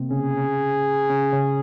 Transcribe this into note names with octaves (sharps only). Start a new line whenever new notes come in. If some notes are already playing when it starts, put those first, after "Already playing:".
Already playing: C3 A#3 C4
C#3 C#4 G#4
C#3 C#4
C#3 C#4